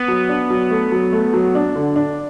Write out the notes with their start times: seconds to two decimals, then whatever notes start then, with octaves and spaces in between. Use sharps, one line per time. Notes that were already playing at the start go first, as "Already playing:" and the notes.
Already playing: B3
0.08 F#3
0.29 D4
0.50 F#3
0.71 A3
0.92 F#3
1.13 A3
1.34 F#3
1.55 D4
1.75 D3
1.96 D4